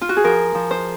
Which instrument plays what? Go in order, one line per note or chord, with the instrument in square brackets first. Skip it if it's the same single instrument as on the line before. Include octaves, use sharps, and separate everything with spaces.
[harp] F4
F#4
G#4
F3 A#4
F3
C5